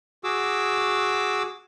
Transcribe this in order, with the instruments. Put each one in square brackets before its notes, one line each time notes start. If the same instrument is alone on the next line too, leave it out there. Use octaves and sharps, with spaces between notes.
[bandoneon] F#4 G#4 D6 E6